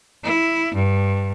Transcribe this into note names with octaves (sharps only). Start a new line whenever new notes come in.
E4
G2